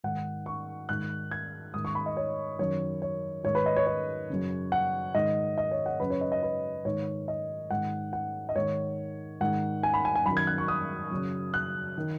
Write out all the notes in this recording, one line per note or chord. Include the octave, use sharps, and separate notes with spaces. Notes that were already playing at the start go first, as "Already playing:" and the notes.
G#2 D#3 F#5
C#6
G#2 D#3 F#6
G#6
G#2 D#3 D#6
C#6
B5
D#5
C#5
F#2 D#3 C#5
C#5
G#2 D#3 C#5
B4
D#5
C#5
C#5
F#2 C#3
F#5
G#2 D#3 D#5
D#5
C#5
F#5
F#2 C#3 B4
C#5
D#5
D#5
B4
G#2 D#3 C#5
D#5
G#2 D#3 F#5
F#5
D#5
G#2 D#3 C#5
G#2 D#3 F#5
G#5
B5
G#5
G#5
F#2 D#3 B5
G#6
F#6
C#6
D#6
F#2 C#3
F#6
D#3